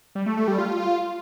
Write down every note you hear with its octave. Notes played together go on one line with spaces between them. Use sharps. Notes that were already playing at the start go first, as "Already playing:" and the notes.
G3
A3
A3
G3
F4